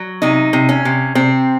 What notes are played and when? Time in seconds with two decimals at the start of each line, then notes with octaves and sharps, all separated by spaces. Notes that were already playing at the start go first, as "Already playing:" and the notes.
Already playing: F#3
0.22 C3 D#4
0.53 C3
0.69 C#4
0.85 C3
1.15 C3 C4